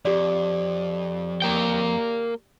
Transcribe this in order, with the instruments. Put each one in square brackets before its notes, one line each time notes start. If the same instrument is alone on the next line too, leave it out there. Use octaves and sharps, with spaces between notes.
[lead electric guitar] F2 [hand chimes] G4 D5
[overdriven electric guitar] A#3 G5